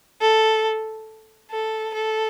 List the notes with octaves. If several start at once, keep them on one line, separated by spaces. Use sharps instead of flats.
A4
A4
A4